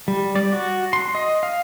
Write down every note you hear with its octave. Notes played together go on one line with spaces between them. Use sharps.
G3
D5
F#4
C6
D#5
F5